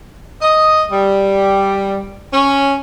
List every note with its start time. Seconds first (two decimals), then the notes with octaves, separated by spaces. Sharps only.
0.42 D#5
0.90 G3
2.31 C#4